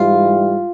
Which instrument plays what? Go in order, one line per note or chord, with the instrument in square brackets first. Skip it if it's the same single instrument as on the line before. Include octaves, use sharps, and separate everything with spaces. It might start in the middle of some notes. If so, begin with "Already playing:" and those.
Already playing: [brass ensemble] G#2 E3 G3 [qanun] F4